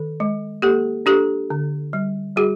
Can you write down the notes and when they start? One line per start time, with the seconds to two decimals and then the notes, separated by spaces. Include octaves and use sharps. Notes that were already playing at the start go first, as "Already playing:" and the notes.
Already playing: D#3 A4
0.20 G#3
0.62 A#3 G4 A4
1.06 D4 G4 A4
1.50 D3
1.93 G3
2.36 G3 F#4 G#4